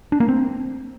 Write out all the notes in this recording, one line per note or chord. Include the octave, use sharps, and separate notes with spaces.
D4
A#3
C4